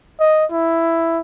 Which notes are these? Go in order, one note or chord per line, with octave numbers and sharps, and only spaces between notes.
D#5
E4